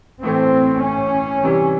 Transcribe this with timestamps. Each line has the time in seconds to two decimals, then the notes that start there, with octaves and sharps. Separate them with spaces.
0.23 A2 E3 A3 C4
0.83 C#4
1.43 C3 E3 G3